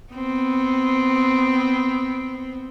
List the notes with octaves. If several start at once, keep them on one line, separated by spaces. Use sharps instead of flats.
B3 C4